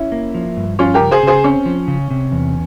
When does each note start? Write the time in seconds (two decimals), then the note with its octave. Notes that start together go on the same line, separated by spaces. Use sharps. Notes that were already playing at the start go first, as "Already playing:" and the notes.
Already playing: C#4 E4
0.12 A#3
0.35 F3
0.57 G2
0.79 F3 C#4 F4
0.94 G4 A#4
1.00 C#3
1.11 G#4 C5
1.23 C#3 G#4 C5
1.44 C4 C#4
1.66 F3
1.88 C#3
2.11 C3
2.32 E2